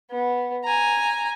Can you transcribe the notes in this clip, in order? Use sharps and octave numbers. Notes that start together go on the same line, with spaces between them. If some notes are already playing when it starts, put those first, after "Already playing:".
B3
G#5 A#5